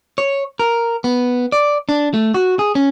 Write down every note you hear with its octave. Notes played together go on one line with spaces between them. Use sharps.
C#5
A#4
B3
D5
D4
A3
F#4
G#4
C#4